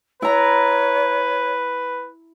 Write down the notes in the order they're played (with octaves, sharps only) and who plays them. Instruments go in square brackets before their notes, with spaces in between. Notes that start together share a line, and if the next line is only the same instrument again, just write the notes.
[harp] E4 A#5 [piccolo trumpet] B4 [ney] C#5